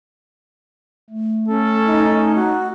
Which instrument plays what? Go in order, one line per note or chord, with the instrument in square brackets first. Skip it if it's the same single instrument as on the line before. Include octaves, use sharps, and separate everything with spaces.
[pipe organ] A3
[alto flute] C#4 [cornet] A4
[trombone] D#4
[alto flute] F#4